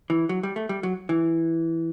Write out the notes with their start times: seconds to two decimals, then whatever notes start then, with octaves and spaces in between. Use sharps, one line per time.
0.10 E3
0.29 F#3
0.43 G3
0.56 A3
0.69 G3
0.83 F#3
1.09 E3